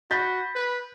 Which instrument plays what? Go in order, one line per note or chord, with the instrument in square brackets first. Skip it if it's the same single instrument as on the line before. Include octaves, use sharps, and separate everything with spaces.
[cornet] F#4 [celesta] B5 B6 [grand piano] G6 A6
[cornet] B4